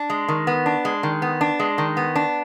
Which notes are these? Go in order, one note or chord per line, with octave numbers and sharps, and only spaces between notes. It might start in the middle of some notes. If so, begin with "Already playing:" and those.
Already playing: D4
G#3
D#3
B3
D4
G#3
D#3
B3
D4
G#3
D#3
B3
D4